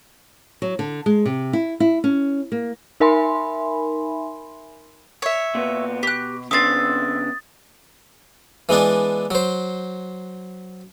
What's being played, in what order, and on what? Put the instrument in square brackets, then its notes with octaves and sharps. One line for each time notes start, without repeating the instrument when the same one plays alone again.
[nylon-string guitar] F#3
D3
G#3
C3
E4
E4
C#4
A#3
[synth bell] D#4 A#4 E5 G#5 B5 C6
[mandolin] C#5 E5
[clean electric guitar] A#2 B3
[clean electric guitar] B2 [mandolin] G4 F#6
[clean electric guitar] C#3 B3 D4 [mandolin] C4 E5 [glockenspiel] D#6 A6
[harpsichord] E3 G#3 B3 D4
F#3 C5